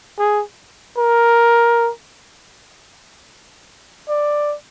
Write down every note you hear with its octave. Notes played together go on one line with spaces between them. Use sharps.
G#4
A#4
D5